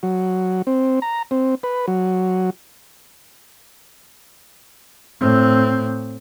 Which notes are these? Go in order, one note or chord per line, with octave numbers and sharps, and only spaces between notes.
F#3
C4
A#5
C4
B4
F#3
A2 C4